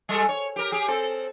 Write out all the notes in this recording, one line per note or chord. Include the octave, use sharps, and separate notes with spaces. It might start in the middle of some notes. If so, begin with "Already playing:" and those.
G3 G#3 A4
C#5
G4 A#4
G4 G#4
C4 A4